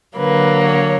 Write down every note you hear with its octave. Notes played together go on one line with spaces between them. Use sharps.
D3 F#3 A#3 B4
C#5